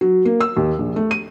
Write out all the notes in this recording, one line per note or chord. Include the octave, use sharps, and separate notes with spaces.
F#3
A#3
E6
D#2
A#1
A3
D#7